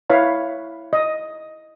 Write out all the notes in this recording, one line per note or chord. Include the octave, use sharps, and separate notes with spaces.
E4 B4 C#5 F5 B5
D#5